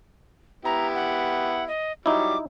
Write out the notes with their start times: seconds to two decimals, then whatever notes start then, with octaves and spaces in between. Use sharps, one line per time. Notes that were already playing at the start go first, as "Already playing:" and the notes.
0.65 B3 E4 G4 A#5
0.95 F#5
1.68 D#5
2.06 F#3 G3 D#4 E4 D6